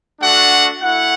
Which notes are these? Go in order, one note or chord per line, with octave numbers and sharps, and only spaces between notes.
A3 D4 F#4 F#5
A3 E4 F#5